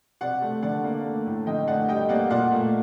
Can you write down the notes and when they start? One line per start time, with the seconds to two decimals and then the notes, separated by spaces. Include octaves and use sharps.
0.21 C3 D5 F#5
0.42 A3
0.63 D3 D5 F#5
0.84 A#3
1.05 A3
1.26 A2
1.47 D3 D#5 G5
1.67 A3 D5 F#5
1.88 G3 D#5 G5
2.09 A#3 D5 F#5
2.30 A#2 D5 F#5
2.52 A3